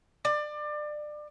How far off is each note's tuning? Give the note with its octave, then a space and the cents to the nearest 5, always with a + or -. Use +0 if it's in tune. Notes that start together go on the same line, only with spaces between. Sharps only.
D5 +25